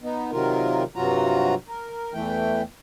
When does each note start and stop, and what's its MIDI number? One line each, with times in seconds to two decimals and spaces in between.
0.02 0.31 59
0.02 0.31 63
0.32 0.83 48
0.32 0.83 51
0.32 0.83 54
0.32 0.83 65
0.32 0.83 70
0.96 1.55 43
0.96 1.55 48
0.96 1.55 54
0.96 1.55 65
0.96 1.55 66
0.96 1.55 82
1.68 2.13 70
2.14 2.62 40
2.14 2.62 52
2.14 2.62 57
2.14 2.62 79